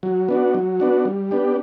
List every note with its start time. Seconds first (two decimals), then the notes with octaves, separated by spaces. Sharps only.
0.03 F#3
0.29 B3 D4 F#4
0.54 F#3
0.80 B3 D4 F#4
1.05 G3
1.31 B3 D4 G4